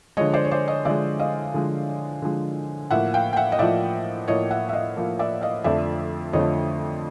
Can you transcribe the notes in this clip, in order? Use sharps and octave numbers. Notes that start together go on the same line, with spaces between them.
D3 F3 G#3 C#5 D#5
C5 D5
C#5
C5 D5
C#5 D#5
D3 F3 G#3 D5 E5
D#5 F5
D3 F3 G#3
D3 F3 G#3
A2 F3 A#3 E5 F#5
F5 G5
G5
E5 F#5
D#5
A2 F3 A#3 D5 E5
A2 F3 A#3 C#5 D#5
E5 F#5
E5
D#5 F5
A2 F3 A#3
D5 E5
D#5 F5
F2 D3 F3 A3 D5 E5
F2 D3 F3 A3 C#5 D#5